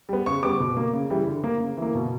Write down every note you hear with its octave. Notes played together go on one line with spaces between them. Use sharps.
G3 B3
C#3 C#6
G3 B3 D6
B2
A#3
C#3
E3 G3
D3
A#3
C#3
E3 A#3
B2